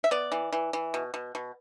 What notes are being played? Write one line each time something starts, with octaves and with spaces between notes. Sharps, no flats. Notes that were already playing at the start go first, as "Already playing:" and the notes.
E5
B3 D5
E3
E3
E3
B2
B2
B2